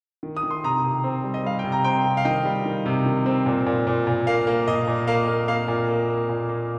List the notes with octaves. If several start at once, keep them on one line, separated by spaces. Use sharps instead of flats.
D#3
D#6
D#3
C6
C3 A#5 D#6
C3
C4
G3
D#5
G3 F5
G5
C3
A#5
C4 G5 C6
C3
F5
D#3 D#5 G5
G3
D#3
C3
D#3
C4
A#2
A#2
A#2
A#2
A#3 F5
A#3
A#2 D#5
A#2
A#3 F5
A#3
A#3 F5
A#2
A#3
A#3
A#2
A#3